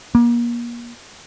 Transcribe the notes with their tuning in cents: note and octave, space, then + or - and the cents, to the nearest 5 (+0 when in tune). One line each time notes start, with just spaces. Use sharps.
A#3 +35